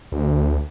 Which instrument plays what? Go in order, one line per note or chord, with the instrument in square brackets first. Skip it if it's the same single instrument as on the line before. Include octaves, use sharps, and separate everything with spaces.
[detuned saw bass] D2